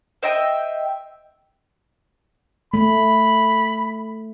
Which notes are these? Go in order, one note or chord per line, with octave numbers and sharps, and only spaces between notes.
C5 D#5 E5 G5
A3 B5